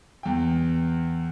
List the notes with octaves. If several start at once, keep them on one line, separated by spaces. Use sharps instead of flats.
E2 G5